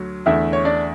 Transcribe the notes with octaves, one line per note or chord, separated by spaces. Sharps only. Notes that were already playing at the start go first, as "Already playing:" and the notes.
Already playing: D2 F#3
E2 D3 A3 E4 E5
C#5
D4 D5